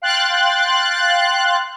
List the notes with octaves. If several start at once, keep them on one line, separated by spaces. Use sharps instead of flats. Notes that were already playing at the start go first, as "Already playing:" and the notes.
F5 G5 C6 F#6 A6